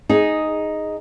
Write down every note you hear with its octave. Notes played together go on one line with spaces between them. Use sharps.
D#4 G#4